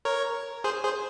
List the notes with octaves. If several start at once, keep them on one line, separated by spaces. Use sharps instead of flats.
A#4 C#5
G#4 C5
G#4 C5